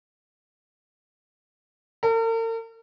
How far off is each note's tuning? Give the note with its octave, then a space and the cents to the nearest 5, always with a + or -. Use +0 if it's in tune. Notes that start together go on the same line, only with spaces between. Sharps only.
A#4 -45